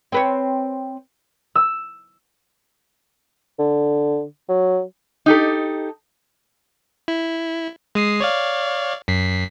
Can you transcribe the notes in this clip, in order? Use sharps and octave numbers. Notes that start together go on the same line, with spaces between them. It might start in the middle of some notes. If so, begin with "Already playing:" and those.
C4 B4 C#5
E6
D3
F#3
D#4 G4 A4
E4
G#3 D#6 C7
C#5 D5 F5
F#2 B6 C7